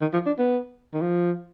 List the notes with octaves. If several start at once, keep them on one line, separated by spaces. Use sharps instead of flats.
D#3
F3
D4
B3
D#3
F3